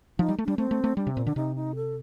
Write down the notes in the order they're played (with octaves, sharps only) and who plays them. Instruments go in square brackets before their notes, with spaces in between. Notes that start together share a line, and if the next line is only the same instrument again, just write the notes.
[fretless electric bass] F3 [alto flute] D#4
[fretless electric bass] G3
A3
[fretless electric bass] G3 [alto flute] D4
[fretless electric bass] A3 [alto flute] C4
[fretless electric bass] A3
A3
[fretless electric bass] G3 [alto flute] D4
[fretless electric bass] C3
[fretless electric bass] A#2 [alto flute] C4
[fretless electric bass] D3 [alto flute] D4
[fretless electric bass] C3 [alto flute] D#4
[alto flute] D#4
A4